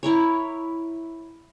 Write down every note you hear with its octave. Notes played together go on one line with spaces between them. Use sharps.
E4 A#4 C#5